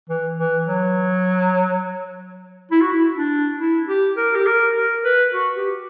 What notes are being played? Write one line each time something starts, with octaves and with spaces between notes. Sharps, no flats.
E3
E3
F#3
E4
F#4
E4
D4
E4
G4
A#4
G4
A#4
A#4
B4
F#4
G4